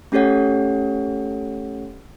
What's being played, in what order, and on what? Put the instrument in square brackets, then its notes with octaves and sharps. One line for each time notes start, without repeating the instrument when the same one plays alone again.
[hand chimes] A3 C#4 G4 A4 C#5 F#5